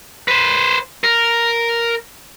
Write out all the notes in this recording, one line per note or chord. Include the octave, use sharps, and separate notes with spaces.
B4 C5
A#4